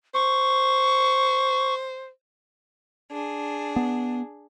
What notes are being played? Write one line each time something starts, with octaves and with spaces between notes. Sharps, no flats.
C5 C#6
D4 G#4
B3